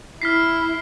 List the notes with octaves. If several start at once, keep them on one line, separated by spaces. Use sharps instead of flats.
E4 F6 B6 C7